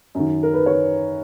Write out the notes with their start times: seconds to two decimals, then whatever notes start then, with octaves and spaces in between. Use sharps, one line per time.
0.15 F#2 D#3
0.43 A#4
0.54 B4
0.66 C#5